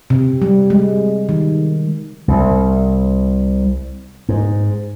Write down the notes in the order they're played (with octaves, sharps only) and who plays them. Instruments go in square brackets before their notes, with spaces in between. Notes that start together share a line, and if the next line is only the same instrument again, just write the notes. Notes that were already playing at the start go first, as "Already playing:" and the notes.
[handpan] C3
G3
G#3
D#3
[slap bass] C2
G#2